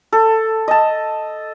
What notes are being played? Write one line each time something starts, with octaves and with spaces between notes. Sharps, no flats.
A4
D#5 A5